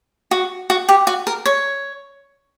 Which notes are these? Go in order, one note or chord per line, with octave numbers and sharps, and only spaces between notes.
F#4
F#4
G4
F#4
A#4
C#5